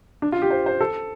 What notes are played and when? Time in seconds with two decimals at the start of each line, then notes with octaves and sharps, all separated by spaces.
0.22 D4
0.32 F4
0.42 G4
0.51 C5
0.66 C5
0.81 A4